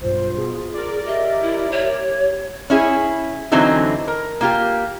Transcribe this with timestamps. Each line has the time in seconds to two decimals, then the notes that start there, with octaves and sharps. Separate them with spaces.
0.01 B1 G2 F4 C5
0.37 B2 G#4
0.74 A#4 D5
1.07 G4 D#5 E5
1.42 E4
1.71 C#5
2.70 C#4 E4 G#4
3.52 D3 E3 F#3 C4 D#4 E4
4.08 A#4
4.41 A#3 F4 G4